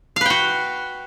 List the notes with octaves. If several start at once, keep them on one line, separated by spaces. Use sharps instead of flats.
F#4 B4 F5 G5